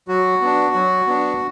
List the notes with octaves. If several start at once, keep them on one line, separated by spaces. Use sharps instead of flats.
F#3 F#4
B3 D4
F#3
B3 D4